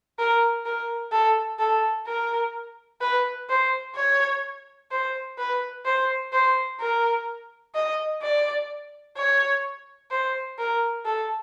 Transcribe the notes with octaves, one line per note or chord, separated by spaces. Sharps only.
A#4
A#4
A4
A4
A#4
B4
C5
C#5
C5
B4
C5
C5
A#4
D#5
D5
C#5
C5
A#4
A4